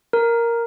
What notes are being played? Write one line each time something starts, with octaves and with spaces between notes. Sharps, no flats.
A#4